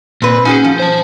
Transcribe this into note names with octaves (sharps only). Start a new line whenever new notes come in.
A#2 C4 B4
C#4 D#4 F#4 G#4 G#5
F3
C5 A5